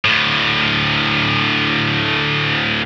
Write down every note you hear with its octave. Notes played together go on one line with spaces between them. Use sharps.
D2 A2